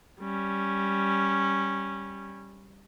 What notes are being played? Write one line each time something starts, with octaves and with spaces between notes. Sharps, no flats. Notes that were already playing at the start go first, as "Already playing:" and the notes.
G3 C#4